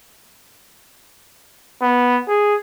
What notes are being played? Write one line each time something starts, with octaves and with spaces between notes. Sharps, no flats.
B3
G#4